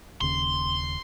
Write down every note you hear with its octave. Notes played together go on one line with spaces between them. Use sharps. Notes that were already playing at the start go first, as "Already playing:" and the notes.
D#1 D#2 C#3 C6